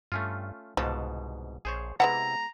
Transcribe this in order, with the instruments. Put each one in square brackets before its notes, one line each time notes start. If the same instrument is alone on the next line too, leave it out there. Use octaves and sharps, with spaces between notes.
[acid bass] G2 [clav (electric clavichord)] A3 C#4 F4
[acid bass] C2 [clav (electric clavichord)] G#2 B2 A5 [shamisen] F3
[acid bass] A#1 [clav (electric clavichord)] G#4 C5 C#5
[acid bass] C3 [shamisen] G#3 B3 F#5 [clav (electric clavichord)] E4 [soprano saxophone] A#5